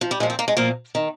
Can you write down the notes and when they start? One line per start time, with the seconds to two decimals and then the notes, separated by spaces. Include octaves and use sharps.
0.01 F3
0.11 G3
0.20 A#2 F3 G#3
0.30 C4
0.39 A#3
0.48 G#3
0.57 A#2 F3 A#3
0.95 D#3